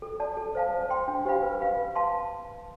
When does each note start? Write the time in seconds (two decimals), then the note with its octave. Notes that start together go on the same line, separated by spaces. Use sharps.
0.02 A4
0.20 D5 A5
0.37 A4
0.55 C5 F5 A5
0.73 C5
0.90 G5 C6
1.08 D4
1.25 G4 C5 F5 B5
1.43 B4
1.61 F5 B5
1.78 B4
1.95 F5 A5 C6